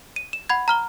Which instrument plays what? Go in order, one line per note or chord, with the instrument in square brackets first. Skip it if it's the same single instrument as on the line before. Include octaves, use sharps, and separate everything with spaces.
[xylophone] D#7
E7
F#5 B5 G#6
A#5 F6 G7